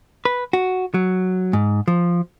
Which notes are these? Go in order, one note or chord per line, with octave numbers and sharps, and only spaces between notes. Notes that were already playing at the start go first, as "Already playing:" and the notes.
B4
F#4
F#3
G#2
F3